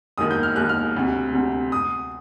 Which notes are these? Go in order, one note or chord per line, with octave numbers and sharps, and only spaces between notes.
E1 D#2 D#3 D#6
G6
F6
E1 D#2 D#3 F#6
F6
E1 D2 C3
E1 D2 C3
D#6